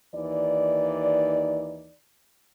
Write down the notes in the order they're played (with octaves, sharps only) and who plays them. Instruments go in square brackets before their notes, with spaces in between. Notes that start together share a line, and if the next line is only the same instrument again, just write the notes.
[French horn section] D#2 E3 D#4 D5